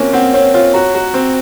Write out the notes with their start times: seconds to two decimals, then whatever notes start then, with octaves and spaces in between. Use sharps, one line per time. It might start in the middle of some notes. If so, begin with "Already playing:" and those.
Already playing: A#3 C4 C#4 F4 F#4 C#5
0.13 C4 F#5
0.34 C4 C#5
0.54 F4 C#5
0.74 F#4 A#5
0.94 F#4 A#5
1.14 C4 C5